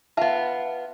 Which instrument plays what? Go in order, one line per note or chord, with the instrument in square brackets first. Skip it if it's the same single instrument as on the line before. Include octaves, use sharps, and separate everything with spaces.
[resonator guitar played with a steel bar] B3 F4 [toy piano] E5 A5